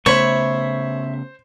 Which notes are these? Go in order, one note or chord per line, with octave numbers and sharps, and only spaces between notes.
C#3 A3 B3 C5 C#5 E5 B5 C#6